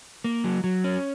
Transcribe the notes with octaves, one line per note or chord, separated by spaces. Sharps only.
A#3
F#3
F#3
C#4